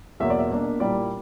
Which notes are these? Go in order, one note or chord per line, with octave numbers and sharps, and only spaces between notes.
E2 B2 F#3 A#3 E5
D5
E5
B2 A#3 D4
A#2 G3 A#3 E4 D5